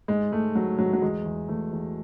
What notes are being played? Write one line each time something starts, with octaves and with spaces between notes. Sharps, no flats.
G#2 G#3
G#2 A3
G#2 F#3
G#2 F#3
F#3
E2 G#3
E2
E2 A3
E2